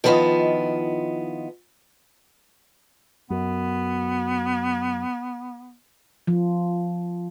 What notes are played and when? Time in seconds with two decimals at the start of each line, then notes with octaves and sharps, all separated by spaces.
0.04 D#3 F3 B3 E4 F4 D#5
3.30 F#2 B3
6.27 F3